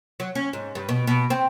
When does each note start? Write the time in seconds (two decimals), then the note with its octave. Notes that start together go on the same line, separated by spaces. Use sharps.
0.20 F#3
0.35 C#4
0.53 G#2
0.75 G2
0.89 B2
1.07 B2
1.30 C4